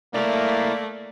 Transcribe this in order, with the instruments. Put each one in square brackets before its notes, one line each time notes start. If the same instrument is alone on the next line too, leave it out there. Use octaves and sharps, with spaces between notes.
[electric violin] A3 [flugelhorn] A#3 [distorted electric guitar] E4 A#4 [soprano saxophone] D5